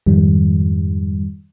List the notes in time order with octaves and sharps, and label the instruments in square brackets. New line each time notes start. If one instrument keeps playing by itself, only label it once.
[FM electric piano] F2 G#2 D#3 G3